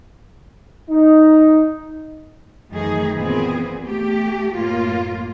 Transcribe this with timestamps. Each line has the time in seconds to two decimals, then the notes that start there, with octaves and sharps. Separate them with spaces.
0.91 D#4
2.71 F#2 D#3 E3 A3 D#4 G#4
3.16 A#2 E3 B3 C4 G#4
3.87 A3 G4
4.54 F#2 A2 A#3 F4